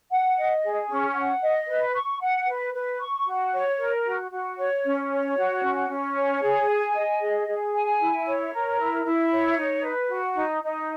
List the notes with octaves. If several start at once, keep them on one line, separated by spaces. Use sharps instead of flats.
F#5
D#5
G#4
C#4
F#5
D#5
B4
C#6
F#5
B4
B4
C#6
F#4
C#5
A#4
F#4
F#4
C#5
C#4
C#5
F#4
C#4
C#4
C#5
G#4
G#5
D#5
G#4
G#4
G#5
E4
C#5
A#4
E4
E4
C#5
D#4
B4
F#4
D#4
D#4